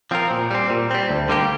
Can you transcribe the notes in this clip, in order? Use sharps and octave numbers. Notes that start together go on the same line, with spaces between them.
F3 C4 F4 A#4
A#2
G3 C4
A#2
G3 C4
D2
D3 G3 A#3 G4